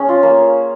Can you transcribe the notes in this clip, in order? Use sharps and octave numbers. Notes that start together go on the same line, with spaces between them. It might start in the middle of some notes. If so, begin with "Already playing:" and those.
Already playing: C#4 G#4
F4
A#3